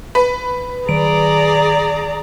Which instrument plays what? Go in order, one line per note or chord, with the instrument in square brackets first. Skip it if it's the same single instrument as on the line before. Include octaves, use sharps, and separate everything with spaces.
[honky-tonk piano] B4
[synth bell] D#3 D7 [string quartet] G#4 D5 A#5